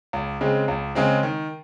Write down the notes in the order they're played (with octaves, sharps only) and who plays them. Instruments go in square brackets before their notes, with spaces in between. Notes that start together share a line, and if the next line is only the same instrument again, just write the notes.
[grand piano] C#2
C#3 G#3 C4
C#2
C#3 G#3 C4
D#3